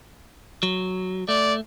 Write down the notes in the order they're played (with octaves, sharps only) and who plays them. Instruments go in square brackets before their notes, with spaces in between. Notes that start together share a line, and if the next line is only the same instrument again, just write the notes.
[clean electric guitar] F#3
[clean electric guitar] A3 [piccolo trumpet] D5